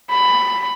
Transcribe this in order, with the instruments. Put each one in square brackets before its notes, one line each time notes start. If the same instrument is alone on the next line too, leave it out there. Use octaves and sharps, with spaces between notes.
[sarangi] B5